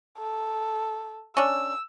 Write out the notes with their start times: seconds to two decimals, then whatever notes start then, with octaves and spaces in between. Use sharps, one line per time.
0.18 A4
1.37 C#4 D4 E6